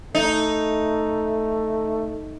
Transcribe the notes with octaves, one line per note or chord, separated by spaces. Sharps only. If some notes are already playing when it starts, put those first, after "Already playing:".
A3 D#4